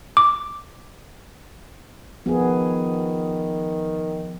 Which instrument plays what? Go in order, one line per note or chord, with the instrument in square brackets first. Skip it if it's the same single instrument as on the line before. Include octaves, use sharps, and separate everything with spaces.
[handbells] D6
[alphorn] D#3 [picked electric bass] F3 [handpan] B3 G#4